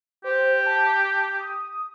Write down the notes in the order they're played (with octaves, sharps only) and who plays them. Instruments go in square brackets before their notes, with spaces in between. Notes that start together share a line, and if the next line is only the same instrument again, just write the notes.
[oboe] G4 [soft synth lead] C5
[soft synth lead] A5
D#6